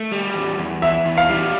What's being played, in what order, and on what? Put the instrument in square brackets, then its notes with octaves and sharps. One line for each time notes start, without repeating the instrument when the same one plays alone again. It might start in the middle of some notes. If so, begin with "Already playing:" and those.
Already playing: [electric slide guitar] A3
G3
E2
E2
[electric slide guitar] E3 [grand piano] E5
[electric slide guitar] E2
[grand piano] F5
[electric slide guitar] G3